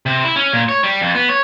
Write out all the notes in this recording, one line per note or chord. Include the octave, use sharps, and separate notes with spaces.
C3
E4
C#4
A#2
C#5
G3
F2
B3
C#5